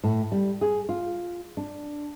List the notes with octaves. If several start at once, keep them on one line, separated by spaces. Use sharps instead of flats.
A2
G3
G#4
F4
D4